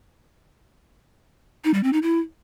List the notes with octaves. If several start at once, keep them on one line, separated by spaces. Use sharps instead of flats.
D#4
G3
C4
D#4
E4